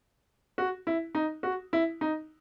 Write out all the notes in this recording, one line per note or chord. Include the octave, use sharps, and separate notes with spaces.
F#4
E4
D#4
F#4
E4
D#4